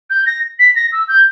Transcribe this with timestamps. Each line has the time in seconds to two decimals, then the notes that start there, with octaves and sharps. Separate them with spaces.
0.10 G6
0.26 A#6
0.59 B6
0.75 A#6
0.92 E6
1.08 G6